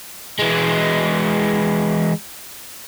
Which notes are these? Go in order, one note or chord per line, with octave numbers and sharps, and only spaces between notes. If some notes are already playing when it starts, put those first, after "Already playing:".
E3 G#3